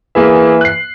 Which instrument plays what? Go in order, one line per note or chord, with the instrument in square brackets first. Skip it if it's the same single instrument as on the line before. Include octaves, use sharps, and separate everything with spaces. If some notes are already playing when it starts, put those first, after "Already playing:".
[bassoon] E3 [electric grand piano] A#3 G#4 E5
[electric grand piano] F#6 C7